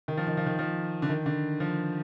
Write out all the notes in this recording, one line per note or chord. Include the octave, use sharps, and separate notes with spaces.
D#3
F3
D#3
F3
D#3
F3
D3
D#3
D3
F3